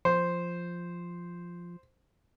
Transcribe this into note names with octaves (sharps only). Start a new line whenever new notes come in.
F3 C5